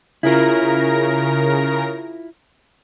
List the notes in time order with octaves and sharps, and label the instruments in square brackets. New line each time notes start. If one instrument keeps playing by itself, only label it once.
[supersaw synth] C#3 A#4 A#6 [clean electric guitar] E4 F4